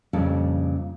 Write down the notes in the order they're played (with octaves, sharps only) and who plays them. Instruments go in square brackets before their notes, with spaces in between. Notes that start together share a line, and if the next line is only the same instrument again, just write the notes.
[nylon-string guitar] F2 A#2 C#3 G3 D4